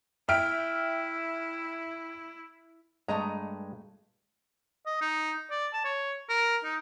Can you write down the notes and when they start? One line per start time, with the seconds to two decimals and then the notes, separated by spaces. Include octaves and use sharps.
0.29 E4 E5 G5 F6 D7
3.08 G2 G#3 A3 D#5 A#5
4.86 D#5
5.01 D#4
5.50 D5
5.73 A5
5.85 C#5
6.29 A#4
6.64 D#4